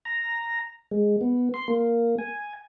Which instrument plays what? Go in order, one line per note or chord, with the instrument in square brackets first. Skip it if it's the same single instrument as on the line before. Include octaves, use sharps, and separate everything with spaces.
[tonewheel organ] A#5
G#3
B3
C6
A#3
G#5